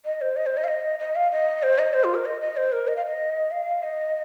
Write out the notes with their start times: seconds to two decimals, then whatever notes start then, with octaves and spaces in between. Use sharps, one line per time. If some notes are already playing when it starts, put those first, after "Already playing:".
0.05 D#5
0.21 C5
0.36 D#5
0.46 C5
0.57 D#5
0.64 F5
0.68 D#5
0.99 D#5
1.16 F5
1.32 D#5
1.63 C5
1.79 D#5
1.93 C5
2.04 F4
2.15 A#4
2.25 D#5
2.41 D#5
2.57 C5
2.72 A#4
2.88 D#5
2.96 F5
3.06 D#5
3.51 F5
3.83 D#5